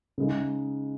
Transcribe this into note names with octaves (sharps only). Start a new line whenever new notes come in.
C#3 G#3 D#4